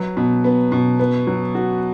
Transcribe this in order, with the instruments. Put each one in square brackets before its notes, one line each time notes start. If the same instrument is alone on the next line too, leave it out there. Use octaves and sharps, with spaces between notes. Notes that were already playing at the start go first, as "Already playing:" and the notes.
Already playing: [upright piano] F#3 B4
B2
B3
B2
B3
F#3
F#4